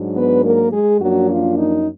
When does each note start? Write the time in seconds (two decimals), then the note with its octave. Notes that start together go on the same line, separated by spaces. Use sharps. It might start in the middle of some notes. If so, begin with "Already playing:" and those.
Already playing: G#2 F#3 D4
0.15 B3 B4
0.43 A#3 A#4
0.72 G#3 G#4
1.00 F#2 F3 F#3 A#3 D4 F#4
1.29 F4
1.57 D#4